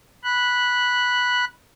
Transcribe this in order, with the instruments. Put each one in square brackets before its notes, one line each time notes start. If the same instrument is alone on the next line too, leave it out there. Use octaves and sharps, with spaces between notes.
[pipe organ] B5 F#6